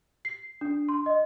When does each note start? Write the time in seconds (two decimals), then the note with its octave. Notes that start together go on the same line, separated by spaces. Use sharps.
0.25 C7
0.61 D4
0.88 C6
1.06 D#5